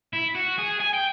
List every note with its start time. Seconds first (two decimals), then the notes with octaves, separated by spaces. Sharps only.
0.13 E4
0.35 F#4
0.58 G#4
0.80 G#5
0.94 G5